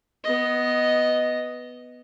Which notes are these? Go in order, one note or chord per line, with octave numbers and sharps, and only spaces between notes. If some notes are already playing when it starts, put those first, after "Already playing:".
B3 D#5